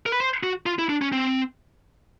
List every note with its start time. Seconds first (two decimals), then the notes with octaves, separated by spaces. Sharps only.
0.06 A#4
0.12 B4
0.20 C5
0.43 F#4
0.66 F4
0.79 E4
0.89 D4
1.02 C#4
1.12 C4